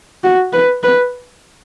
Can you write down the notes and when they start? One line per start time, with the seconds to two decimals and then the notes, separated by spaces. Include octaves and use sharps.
0.24 F#4
0.53 B4
0.83 B4